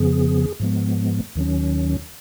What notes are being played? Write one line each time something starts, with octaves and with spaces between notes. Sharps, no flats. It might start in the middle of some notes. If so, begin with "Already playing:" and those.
Already playing: F2 C#3 F3 B3 G#4
G#2 F3 G#3 B3
D#2 D#3 F#3 C#4